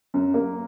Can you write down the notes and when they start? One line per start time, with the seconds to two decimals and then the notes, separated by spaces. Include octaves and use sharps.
0.14 F#2
0.34 A#3